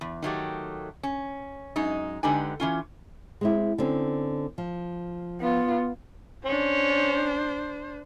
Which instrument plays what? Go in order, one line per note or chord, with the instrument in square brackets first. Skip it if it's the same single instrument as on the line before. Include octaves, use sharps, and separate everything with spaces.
[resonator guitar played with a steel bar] E2
D#3 F#3 A3 G4
C#4
F#2 G#3 D#4
D3 G#3 D#4 G4 B4 G#5
E3 C#4 F4
[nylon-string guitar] G#3 C4 E4
D3 C4 C#4
F3
[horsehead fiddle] B3 F4
[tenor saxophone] C#4 [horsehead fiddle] D4 C5